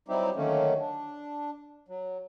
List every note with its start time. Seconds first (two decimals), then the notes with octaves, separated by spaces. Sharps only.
0.08 F#3 G3 C4 D#4 E4 G4
0.36 D3 D#3 F#3 A3 A#3 C#4
0.80 D4
1.88 F#3